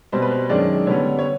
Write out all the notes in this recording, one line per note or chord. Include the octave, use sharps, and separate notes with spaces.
B2 G3 C4 C5
B4
C5
F#2 D#3 G#3 C#4 D4 D5
D3 G3 B3 C#4 C#5
C#5